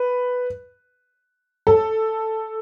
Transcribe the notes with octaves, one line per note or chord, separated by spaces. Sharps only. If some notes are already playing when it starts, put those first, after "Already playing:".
Already playing: B4
A4